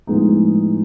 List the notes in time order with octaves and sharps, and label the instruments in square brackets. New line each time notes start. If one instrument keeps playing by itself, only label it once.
[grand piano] A2 F3 G#3 B3 D#4